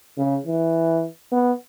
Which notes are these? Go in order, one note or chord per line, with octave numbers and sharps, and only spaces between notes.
C#3
E3
B3